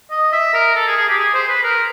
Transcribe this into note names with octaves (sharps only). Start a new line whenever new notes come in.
D#5
E5
A#4
A4
G#4
G#4
G4
G#4
C5
B4
A#4